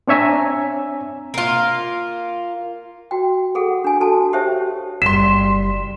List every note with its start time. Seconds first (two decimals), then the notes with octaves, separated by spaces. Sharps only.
0.08 C4 D4 C#5 E5 G#5 A#5
1.34 A#3 F4
3.11 F#4 G5
3.55 G#4 A4 F#5
3.84 D4 G#5
4.00 F#4 A4 A5
4.33 G4 C5 C#5 E5 G5
5.02 F#1 G3 C6 B6 E7